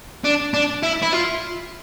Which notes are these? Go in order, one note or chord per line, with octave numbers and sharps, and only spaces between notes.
D4
D4
E4
E4
F4